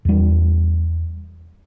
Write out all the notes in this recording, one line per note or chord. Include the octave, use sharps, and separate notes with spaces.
E2 G3